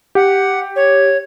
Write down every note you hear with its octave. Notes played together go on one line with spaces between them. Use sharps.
G4 F#5
C#5